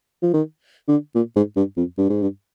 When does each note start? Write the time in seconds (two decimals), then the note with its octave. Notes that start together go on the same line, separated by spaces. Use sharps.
0.22 F3
0.33 D#3
0.88 D3
1.15 A#2
1.36 G#2
1.56 G2
1.77 F2
1.98 G2
2.09 G#2
2.22 G2